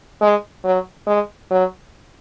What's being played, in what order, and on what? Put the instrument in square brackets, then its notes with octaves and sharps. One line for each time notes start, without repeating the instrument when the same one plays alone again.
[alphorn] G#3
F#3
G#3
F#3